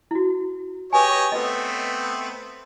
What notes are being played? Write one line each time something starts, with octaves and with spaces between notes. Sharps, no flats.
E4 F#4
G4 G#4 B4 C#5 D#5 G#5
A3 B3 C4 B4 D#5